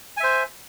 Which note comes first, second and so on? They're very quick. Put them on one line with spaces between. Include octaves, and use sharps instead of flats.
G#5 E5 C5